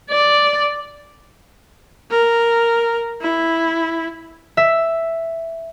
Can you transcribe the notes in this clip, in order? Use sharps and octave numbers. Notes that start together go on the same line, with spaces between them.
D5
A#4
E4
E5